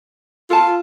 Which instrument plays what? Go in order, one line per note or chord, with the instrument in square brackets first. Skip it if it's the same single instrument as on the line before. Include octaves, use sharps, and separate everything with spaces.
[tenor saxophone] F4 [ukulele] A4 A5